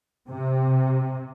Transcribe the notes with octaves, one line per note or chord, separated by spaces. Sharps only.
C3